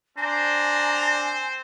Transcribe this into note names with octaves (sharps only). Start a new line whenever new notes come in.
C4 D4 C5 G#5 A#5